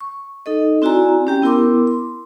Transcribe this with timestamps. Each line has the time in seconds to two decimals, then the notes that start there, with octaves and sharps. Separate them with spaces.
0.01 C#6
0.46 D#4 A4 D#5
0.82 C4 E4 F#4 D5 G#5 A#5
1.27 C#4 G4 G5
1.42 B3 E4 A#4 C6 D6
1.87 C6